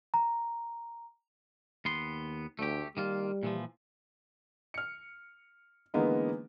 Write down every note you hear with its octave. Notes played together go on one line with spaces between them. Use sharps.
A#5
D#2 B3 C6
D2 A3 G4
D#3 G3 A#3 F4
A#2 E3 F3
F6 C#7
D3 E3 G#3 A#3 B3 D#4